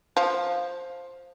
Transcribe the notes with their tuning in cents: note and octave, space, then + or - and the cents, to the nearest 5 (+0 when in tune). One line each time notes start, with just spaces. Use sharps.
F3 +5